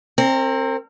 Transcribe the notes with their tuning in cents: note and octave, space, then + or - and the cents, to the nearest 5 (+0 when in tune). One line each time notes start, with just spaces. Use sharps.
C4 +25 A#4 -30